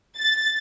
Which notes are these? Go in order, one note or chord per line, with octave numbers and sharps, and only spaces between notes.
A6